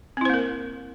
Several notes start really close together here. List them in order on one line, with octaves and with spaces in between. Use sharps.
C4 E4 C5 A#3 A#4